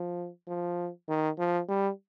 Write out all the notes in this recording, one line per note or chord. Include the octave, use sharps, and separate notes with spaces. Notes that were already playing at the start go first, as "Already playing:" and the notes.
Already playing: F3
F3
D#3
F3
G3